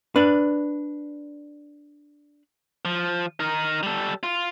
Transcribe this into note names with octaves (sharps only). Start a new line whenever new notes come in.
D4 B4
F3
D#4 A#4
G3 A4
F4